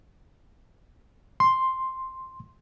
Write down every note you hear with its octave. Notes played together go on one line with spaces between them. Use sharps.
C6